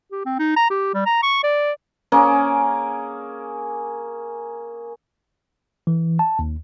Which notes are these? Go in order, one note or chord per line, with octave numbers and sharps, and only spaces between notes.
G4
C4
D#4
A#5
G4
G3
A#5
C#6
D5
A#3 C#4 G#4
E3
A5
D#2